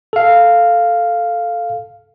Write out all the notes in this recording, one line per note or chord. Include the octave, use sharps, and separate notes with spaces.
A4 F5